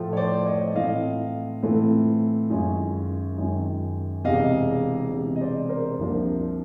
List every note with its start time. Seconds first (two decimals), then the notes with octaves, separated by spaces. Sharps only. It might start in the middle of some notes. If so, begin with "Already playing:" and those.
Already playing: A2 F3 A3
0.13 C#5
0.17 C5 D5
0.46 C#5 D#5
0.75 A2 E3 A3 C4 F4 D#5 F5
1.63 A2 E3 A3 C4 F4
2.50 F#2 D#3 G#3 C#4 F4
3.38 F#2 D#3 G#3 C#4 F4
4.24 E1 E2 C3 D#5 F5
5.12 E1 E2 C3
5.36 D#5
5.41 C5 D5
5.69 A#4 C5
5.99 C2 C3 F3 A#3 D4